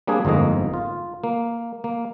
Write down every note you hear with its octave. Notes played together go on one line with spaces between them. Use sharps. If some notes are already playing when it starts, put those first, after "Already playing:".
G3 A#3 C4 D4 G#4
G1 F2 G#2 A#3 D#5
F4
A#3
A#3